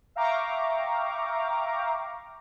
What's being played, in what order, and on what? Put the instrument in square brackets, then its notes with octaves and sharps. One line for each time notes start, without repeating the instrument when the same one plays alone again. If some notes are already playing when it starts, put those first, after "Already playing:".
[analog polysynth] E5 F5 G5 A#5 C#6 D6